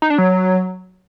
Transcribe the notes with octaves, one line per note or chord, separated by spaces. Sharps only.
D#4
D4
F#3